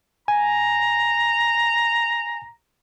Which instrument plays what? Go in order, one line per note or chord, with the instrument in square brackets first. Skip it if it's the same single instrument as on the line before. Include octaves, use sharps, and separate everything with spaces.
[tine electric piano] G#5 [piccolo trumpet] A#5